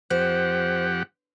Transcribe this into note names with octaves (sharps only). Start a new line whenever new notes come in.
F2 G4 C5 F#5